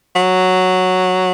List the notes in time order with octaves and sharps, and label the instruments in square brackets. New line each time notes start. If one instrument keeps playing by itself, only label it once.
[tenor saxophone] F#3